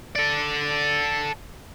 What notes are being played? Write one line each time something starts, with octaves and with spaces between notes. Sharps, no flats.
A4 D5